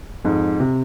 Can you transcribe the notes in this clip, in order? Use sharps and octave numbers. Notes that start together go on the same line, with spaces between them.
F2 G#2
C3